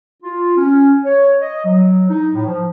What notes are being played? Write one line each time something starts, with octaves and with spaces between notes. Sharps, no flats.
F4
C#4
C#5
D#5
F#3
D#4
A2
F3